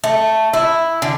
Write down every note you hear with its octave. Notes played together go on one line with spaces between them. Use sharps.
A3
E4
D3